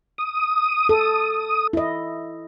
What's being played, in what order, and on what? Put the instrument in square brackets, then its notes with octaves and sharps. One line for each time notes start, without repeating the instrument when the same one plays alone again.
[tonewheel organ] D#6
[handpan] A4
E4 D#5